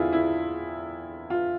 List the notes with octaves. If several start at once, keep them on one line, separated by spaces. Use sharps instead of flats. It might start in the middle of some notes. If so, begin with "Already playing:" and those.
Already playing: E2 D3 A3 C4 E4 F4 G#4
E4
F4